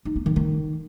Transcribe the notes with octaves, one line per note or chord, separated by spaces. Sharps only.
D#4
B3
D#3
D#3